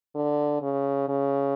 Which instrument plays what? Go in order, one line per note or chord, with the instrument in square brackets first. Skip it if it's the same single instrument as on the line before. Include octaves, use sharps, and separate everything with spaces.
[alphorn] D3
C#3
C#3